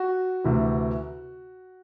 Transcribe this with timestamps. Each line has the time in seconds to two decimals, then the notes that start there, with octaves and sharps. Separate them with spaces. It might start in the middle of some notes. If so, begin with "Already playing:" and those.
Already playing: F#4
0.44 D2 C3 E3